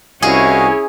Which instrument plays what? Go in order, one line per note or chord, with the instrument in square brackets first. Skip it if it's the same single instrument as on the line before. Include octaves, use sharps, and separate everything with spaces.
[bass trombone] C2 [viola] C#4 E4 [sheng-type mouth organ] F#4 D#5 F5 [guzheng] G#4